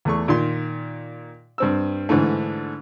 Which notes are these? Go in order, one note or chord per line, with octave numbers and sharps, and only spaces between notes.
E2 A3 C#6
A#2 D#3 C6
G2 C4 E6
G#2 D3 E3 A3